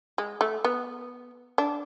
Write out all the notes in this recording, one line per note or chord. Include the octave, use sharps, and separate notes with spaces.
G#3
A3
B3
D4